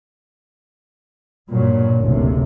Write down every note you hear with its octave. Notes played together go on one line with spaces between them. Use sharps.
G2 A#2 F#3
F#1 D2 C3